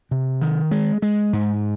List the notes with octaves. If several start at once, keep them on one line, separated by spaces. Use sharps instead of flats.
C3
D#3
G#3
G#3
G#2